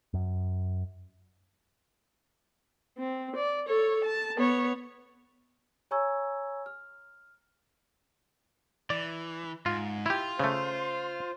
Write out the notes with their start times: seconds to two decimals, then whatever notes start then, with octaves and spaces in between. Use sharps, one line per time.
0.14 F#2
2.98 C4
3.36 D5
3.68 A4 C#5
4.04 A5
4.37 B3 C#5
5.91 C#5 G#5 A#5 C#6 E6 G#6
6.66 F6
8.90 E3 D5
9.66 G#2 F4
10.06 E4 F4 G4
10.39 C#3 A3 C5